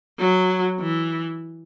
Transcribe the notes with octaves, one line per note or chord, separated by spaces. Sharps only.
F#3
E3